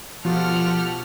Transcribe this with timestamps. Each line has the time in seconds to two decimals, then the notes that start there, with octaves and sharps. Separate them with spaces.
0.25 B2 F3 F4 G4 A4 F#5 F6